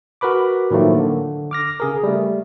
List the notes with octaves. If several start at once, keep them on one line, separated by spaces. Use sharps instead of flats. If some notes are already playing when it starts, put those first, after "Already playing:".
F#4 A#4 B4 B5 D6
A2 D#3 F3 F#3 A3 A#3
D3
D6 F6 A#6
C#3 G#4 A#4
G3 A3